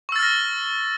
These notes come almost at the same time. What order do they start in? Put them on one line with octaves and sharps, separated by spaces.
C#6 E6 A6 F6 A#6